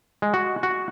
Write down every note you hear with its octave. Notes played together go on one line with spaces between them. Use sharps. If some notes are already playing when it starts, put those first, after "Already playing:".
G#3
F#4
F#4